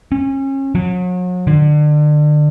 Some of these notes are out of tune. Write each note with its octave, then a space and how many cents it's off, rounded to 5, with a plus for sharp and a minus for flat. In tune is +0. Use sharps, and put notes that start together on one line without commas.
C#4 -30
F#3 -40
D3 +30